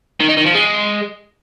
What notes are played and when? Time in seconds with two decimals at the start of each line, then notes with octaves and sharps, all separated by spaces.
0.20 D#3
0.29 D#4
0.38 D#3
0.46 F3
0.55 G#3